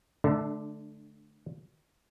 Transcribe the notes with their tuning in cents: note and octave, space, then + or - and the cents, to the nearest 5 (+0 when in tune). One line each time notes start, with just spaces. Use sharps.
D3 +0 A3 -25 D4 +35